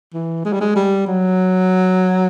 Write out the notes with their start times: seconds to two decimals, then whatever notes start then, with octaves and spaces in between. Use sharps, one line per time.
0.14 E3
0.45 G#3
0.53 G3
0.60 G#3
0.76 G3
1.07 F#3